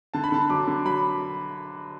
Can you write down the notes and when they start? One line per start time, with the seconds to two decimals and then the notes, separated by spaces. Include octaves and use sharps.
0.14 D3 A5
0.24 B5
0.32 D3 A5
0.50 F#3 D6
0.68 D3
0.85 F#3 B5